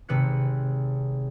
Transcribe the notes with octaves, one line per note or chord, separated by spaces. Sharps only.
G#1 C3 B4 F#6 C#7